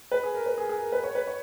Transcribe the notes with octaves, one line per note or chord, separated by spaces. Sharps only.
B4
G#4
A#4
B4
G#4
G#4
A#4
B4
C#5
B4
C#5